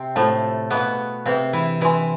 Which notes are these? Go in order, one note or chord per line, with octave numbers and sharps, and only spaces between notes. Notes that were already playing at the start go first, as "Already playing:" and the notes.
Already playing: C3 C4
A2 A3 F4 A4 C5 F5 A5
B2 B3 G#4 B4 F5
C3 C4 G#4 B4 F5
E3 E4
E3 E4 F4 B4 E5 G#5 C6